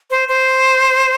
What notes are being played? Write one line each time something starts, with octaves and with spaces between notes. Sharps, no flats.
C5
C5